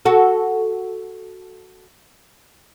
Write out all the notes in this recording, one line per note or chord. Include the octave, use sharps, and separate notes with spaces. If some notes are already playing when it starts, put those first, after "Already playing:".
F#4 A4